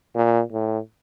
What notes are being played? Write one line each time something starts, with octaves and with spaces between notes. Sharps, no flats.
A#2
A2